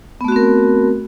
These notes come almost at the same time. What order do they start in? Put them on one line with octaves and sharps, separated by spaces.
B3 A3 F#4 C4 A#4